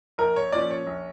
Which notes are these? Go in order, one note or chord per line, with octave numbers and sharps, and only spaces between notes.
A#1 A#4
C#5
A#2 F3 C#4 D5
C#5
A#1